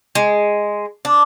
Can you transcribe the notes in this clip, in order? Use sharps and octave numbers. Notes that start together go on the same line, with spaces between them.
G#3
D4